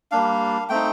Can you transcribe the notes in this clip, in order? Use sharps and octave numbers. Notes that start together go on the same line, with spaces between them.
G3 A#3 D4 F5
A3 C4 D#4 G5